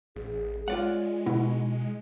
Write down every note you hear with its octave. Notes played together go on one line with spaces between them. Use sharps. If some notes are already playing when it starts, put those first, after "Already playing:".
A1 G#4
G#3 F4 C#5 D5 F#5
B2 B3 D#4 E4